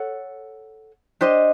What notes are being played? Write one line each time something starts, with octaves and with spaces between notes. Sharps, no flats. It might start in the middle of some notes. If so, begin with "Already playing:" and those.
Already playing: A4 C#5 F#5
D4 G4 C5 D#5